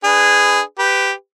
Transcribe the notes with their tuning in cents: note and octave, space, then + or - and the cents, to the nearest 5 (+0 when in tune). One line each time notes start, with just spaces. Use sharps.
D4 +0 G#4 -10 B4 +20
G4 +0 B4 +20